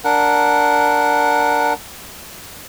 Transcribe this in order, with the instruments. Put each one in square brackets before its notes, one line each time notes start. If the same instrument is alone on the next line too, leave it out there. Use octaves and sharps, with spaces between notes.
[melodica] D4 A#4 F#5